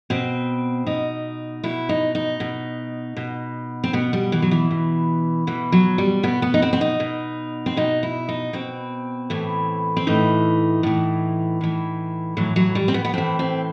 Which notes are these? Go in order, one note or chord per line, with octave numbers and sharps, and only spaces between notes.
B2 C4
B2 D#4
B2 E4
D#4
D#4
B2
B2
C4
B2 B3
G3
E3
F#3
E3
B2
B2 E3
F#3
G3
B2 B3
B3
D#4
C4
C4
D#4
B2
C4
B2 D#4
E4
D#4
B2 C4
A2 E3
C4
A2 E3 D#4
A2 E3
A2 E3
A2 E3 F#3
F#3
G3
C4
B3
B3
A2 E3 C4
C4